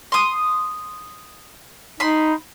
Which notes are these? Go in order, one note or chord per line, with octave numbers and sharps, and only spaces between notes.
C6 D#6
D#4 B5 C6